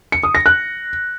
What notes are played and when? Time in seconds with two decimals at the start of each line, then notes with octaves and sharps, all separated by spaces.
0.12 C#7
0.23 D#6
0.35 A#6
0.46 F#6